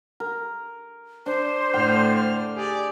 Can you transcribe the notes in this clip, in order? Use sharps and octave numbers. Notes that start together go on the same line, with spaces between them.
A#4
D4 C5
A2 D3 G5 F6
G4 G#4 D5